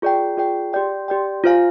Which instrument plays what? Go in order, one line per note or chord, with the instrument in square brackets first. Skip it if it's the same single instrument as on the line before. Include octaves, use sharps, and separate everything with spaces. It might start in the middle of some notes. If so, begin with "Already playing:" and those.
[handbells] F4 G#4 D5 G5
F4 G#4 D5 G5
G4 D5 G5
G4 D5 G5
F4 C5 F5 G#5